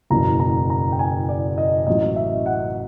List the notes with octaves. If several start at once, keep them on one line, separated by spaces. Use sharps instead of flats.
F#1 E2 B2 F#3 A#5
A#5
A#5
G5
G#5
D5
D#5
A1 A2 F#3 D#5
E5
F#5